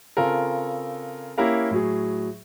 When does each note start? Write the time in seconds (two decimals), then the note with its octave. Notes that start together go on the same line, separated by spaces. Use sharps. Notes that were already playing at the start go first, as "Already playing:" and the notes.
0.17 C#3 C4 F4 A4 A#4
1.38 A#3 C#4 E4 G4 A#4 F5
1.71 A2 F#3 G#4